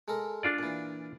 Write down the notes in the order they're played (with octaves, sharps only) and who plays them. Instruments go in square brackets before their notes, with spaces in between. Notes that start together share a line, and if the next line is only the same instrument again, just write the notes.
[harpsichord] G#3 A4 A#4
[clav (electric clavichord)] D4 F4 D5
[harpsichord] A#2 E3